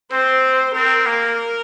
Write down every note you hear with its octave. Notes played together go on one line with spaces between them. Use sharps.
C4 C5
C4 A#4
A#3